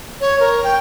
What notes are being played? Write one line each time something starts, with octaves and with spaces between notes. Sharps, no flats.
C#5
A#4
G5